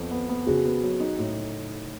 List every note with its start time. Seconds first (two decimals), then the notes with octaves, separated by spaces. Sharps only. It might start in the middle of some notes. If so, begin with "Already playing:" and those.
Already playing: F2 B3
0.11 B3
0.29 B3
0.47 C#3 F#4 G#4
0.65 B3
0.83 F#3
1.00 D#4
1.18 A2